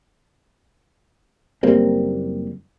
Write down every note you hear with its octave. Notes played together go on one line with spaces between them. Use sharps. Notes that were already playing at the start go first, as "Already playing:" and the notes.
F#1 G3 A#3 C4